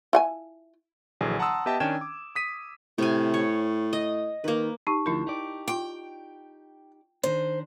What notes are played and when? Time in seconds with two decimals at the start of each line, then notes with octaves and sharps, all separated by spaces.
0.13 E4 F#5 G#5
1.21 A#1 D3 E3 F#3 G#4
1.39 F#5 A5 A#5 C6 D#6 E6
1.66 B3 G4 D#5 E5 G5 A5
1.80 D#3 C#4 D4 G5 G#6 E7
2.01 D6
2.35 D#6 B6 D#7
2.98 A2 C3 G#5
3.34 C#5
3.93 D#5
4.44 D#3 A#3 B4
4.87 D#4 G4 A5 C#6
5.06 D2 F3 D4 E4 A#4
5.27 D#4 G4 D5
5.68 F4 G5 D6
7.23 D#3 D4 C5